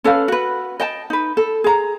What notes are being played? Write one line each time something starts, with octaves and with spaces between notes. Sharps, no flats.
C#4 A4 B4 F5
F#4 B4
D#5 G5 A5
D#4 B4
A4
G#4 A#5